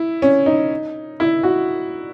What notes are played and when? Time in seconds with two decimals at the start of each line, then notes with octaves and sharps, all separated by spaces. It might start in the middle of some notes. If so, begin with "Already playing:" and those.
Already playing: E4
0.22 C#4
0.46 D#4
1.20 E4
1.43 F#4